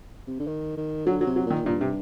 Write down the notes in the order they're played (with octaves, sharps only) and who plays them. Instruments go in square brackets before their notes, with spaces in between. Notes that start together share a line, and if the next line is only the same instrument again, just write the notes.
[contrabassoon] C3
D3
D#3
D#3
[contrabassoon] D3 [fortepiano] F#3
[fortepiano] F#3
[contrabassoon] C3
[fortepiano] F#3
[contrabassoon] A#2 [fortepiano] D#3
[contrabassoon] G2 [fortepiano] A#2
[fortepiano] C3